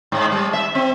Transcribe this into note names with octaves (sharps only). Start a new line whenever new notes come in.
G#2
G3
E5
C4